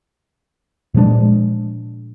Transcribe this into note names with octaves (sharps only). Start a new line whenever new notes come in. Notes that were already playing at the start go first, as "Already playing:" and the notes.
A#2 F3 G#3 D4